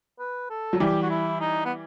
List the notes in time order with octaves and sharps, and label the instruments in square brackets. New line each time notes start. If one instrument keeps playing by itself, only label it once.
[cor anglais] B4
A4
[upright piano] F#3
[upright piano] E3 G3 [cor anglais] G4
[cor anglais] F#4
E4
D#4
B3